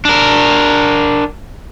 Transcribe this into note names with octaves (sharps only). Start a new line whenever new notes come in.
D4 A#4